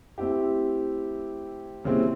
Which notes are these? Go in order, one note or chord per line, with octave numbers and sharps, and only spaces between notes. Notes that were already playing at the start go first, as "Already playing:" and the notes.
A3 C4 E4 G4
A#2 C#3 G3 C4 E4